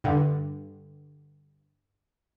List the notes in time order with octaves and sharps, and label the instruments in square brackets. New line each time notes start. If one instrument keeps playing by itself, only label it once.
[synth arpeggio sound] G2 D3